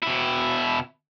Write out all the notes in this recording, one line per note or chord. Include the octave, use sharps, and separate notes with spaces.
B2 E4